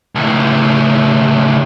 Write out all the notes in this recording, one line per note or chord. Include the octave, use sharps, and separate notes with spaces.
C#2 A2